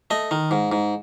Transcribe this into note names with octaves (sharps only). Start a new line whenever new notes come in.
A3 D#5
D#3
G#2
G#2